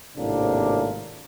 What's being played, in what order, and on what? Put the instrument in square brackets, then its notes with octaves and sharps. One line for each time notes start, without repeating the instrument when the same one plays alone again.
[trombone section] G#1 A2 C3 A#3 D4